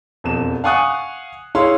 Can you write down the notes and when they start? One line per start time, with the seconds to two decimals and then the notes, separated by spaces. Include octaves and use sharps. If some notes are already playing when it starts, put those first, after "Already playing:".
0.24 E1 F2 E7
0.64 F5 F#5 G#5 C#6 D#6 F#6
1.55 E4 G#4 C#5 F5 C6